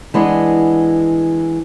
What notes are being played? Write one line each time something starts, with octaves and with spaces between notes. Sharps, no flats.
E3 G#3 B3 D4